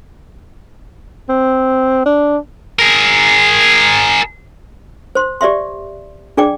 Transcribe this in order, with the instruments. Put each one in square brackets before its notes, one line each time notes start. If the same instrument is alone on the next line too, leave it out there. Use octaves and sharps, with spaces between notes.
[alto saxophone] C4
D4
[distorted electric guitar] G#4 A#4
[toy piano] C5 C6
G4 D5 E5 C6
D4 G#4 D5 G5 D6